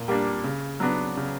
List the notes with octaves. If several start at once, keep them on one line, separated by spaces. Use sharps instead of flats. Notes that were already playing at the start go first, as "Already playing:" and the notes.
Already playing: A#2
G3 A#3 D4
C#3
F#3 B3 D4
C#3